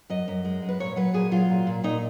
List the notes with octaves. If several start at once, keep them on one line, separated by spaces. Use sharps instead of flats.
F#2 D#5
F#2
G#3
F#2
B4
A#2 C#5
F#3 B4
A#2 G#4
F#3 F4
A#2
A#2
A#2 D#4